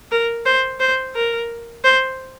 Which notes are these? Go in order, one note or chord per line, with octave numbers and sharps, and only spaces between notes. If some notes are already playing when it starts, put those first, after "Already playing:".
A#4
C5
C5
A#4
C5